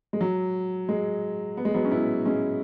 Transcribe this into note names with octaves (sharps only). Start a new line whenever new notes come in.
G#3
F#3
G#3
B3
G#3
F#3 B3
C#4
B3 E4
G#3 C#4